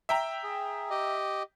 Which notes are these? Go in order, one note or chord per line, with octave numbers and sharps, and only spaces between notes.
E5 G5 A#5
G#4
G4 D#5